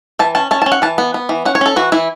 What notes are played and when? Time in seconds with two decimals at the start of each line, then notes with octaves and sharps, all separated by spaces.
0.19 E3 A5
0.35 C#4 A5
0.51 C#4 A5
0.62 C#4 A5
0.72 F#5
0.82 E3 A5
0.98 B3
1.14 B3
1.29 E3
1.45 C#4 F#5
1.55 C#5
1.61 C#4 A4
1.76 E3 F#4
1.92 E3 E4